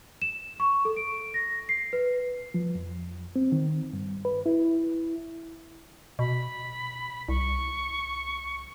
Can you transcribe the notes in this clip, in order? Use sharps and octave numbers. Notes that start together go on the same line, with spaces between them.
E7
C#6
A4
D7
A#6
C7
B4
F3
F2
C4
D#3
G2
B4
E4
B2 B5
C2 C#6